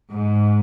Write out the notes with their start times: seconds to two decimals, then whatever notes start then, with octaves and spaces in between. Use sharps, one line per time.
0.11 G#2